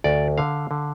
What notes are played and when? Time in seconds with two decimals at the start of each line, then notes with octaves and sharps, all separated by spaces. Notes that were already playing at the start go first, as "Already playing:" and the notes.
0.04 D2 D5
0.38 D3 F5
0.71 D3